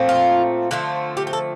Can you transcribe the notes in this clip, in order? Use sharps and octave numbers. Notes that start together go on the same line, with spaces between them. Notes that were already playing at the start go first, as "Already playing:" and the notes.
Already playing: A#2 F3 A3 C4
F4
D3 F3 A3 C4
G4
G4
A4